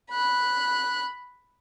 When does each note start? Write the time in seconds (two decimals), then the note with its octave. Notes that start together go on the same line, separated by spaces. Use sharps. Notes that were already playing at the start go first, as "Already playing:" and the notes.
0.10 B5 F#6